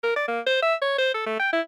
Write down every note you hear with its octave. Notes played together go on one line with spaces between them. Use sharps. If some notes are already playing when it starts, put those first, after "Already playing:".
A#4
D5
A#3
C5
E5
C#5
C5
A4
A3
G5
E4